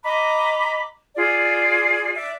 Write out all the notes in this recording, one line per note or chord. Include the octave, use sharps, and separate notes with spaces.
D#5 A#5 B5 D6
F4 G#4 D5
D5 E5